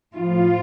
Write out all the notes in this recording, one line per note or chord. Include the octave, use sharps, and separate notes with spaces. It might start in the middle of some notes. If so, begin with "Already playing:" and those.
A2 F3 F4